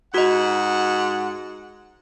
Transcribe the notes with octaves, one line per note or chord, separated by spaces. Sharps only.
G#2 F#4 D#5 F#5